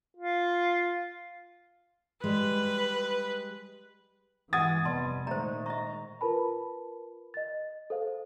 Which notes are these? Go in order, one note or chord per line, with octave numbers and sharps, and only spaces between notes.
F4
G3 G#3 B4
G2 E3 G#3 F#5 G#5 D#6 G#6 A6
F1 C3 G3 B3 D#5 A5 C6
A#2 D#3 G#3 A3 C5 A#5
D#5 A#5 C#6
F4 A#4 B4 A5 B5
D#5 A6
A4 C5 F5